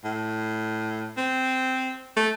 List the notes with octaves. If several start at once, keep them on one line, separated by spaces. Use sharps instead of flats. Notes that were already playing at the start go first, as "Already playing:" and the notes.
A2
C4
A3